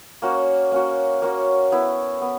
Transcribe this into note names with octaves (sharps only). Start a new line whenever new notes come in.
A#3 C#4 F#4
A#3 C#4 F#4
A#3 C#4 F#4
B3 E4 B4
B3